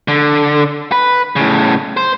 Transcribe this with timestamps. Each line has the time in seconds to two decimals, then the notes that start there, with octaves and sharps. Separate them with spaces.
0.08 D3
0.92 B4
1.36 A2 C#3
1.97 C5